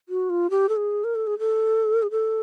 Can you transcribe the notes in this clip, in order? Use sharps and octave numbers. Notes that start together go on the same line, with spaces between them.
F#4
F4
G4
A4
G#4
A#4
A4
G#4
A4
G#4
A4